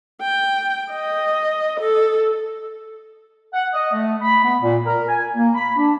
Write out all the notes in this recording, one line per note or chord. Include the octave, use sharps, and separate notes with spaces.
G5
D#5
A4
F#5
D#5
A3
B5
B3
A#2
A#4
G#5
A#3
B5
D4